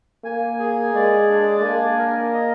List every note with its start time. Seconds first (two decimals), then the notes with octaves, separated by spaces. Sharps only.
0.24 A#3 G#5
0.59 G#4
0.95 G#3 D5
1.29 D4
1.64 A#3 G#5
1.99 A#4
2.34 D#5